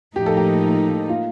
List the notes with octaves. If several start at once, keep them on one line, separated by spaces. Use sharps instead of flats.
A2 F3 A#3 D#4 G4
A4
G4
F4